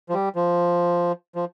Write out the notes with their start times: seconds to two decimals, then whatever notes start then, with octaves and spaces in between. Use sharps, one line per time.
0.09 F3
0.14 G3
0.36 F3
1.35 F3